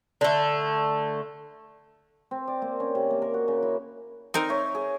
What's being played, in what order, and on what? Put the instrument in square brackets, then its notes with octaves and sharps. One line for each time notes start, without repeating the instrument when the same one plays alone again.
[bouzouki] D3 A3
[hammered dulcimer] C4
D5
A#3
C#4
C3
A#3
A#4
F#4
C#3
E4
[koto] C4 D#4 A#4
[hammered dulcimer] C#5 E5
G#4